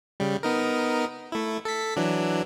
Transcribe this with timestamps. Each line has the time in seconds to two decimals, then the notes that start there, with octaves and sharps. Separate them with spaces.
0.20 C#3 G3
0.43 B3 D#4 A#4
1.32 A3 E4
1.65 A4 B6
1.96 E3 F#3 D4